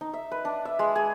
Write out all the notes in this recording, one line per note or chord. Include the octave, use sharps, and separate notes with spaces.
D#4
E5
B4
D4
E5
G#3
G#4